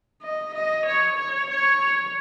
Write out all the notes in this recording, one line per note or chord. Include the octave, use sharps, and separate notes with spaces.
D#5
D#5
C#5
C#5
C#5